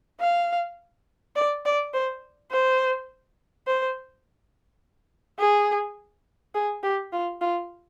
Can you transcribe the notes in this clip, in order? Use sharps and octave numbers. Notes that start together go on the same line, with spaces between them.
F5
D5
D5
C5
C5
C5
G#4
G#4
G4
F4
F4